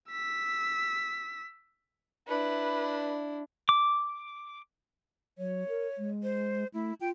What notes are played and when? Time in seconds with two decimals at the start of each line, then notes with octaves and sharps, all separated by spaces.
0.11 E6 B6
2.28 D4 E4 B4
3.69 D6
5.38 F#3 C#5
5.69 A#4
5.98 G#3
6.23 C5
6.74 A3 E4
7.01 F4 G5